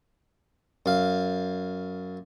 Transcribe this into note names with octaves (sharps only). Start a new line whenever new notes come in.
F#2 F5